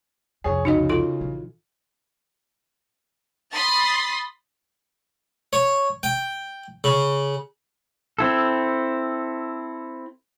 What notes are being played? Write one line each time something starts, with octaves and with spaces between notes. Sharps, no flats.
C2 F2 G#4 C#5
C#3 D#4 F#4 D#5
F4 A4 C6
A#1 E3
B5 C6 D#6 A6 B6
C#5
G5
C#3
C4 E4 A4